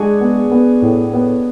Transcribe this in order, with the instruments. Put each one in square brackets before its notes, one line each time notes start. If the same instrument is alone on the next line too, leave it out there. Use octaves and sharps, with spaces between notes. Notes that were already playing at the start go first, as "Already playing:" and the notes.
Already playing: [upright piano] G#3 [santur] D4 F#4 G#4
[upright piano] B3
B3
A2
B3